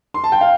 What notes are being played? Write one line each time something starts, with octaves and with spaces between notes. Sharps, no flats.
C6
A5
G5
F5